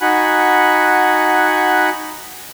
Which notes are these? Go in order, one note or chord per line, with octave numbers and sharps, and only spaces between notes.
D#4 F#4 F#5 G#5 B5 F#6